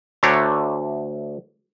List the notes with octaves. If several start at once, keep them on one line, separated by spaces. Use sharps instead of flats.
D2 D3 A3 D4 C#5 A#5